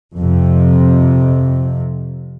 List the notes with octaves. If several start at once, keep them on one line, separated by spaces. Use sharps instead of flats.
F2 C3